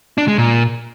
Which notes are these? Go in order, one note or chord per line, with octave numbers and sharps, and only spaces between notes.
D4
G#3
A#2